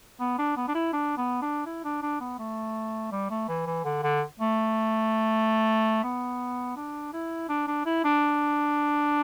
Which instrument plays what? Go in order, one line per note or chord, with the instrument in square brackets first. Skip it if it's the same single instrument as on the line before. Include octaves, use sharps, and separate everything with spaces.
[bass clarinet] B3
D4
B3
D4
E4
D4
B3
D4
E4
D4
D4
B3
A3
G3
A3
E3
E3
D3
D3
A3
B3
D4
E4
D4
D4
E4
D4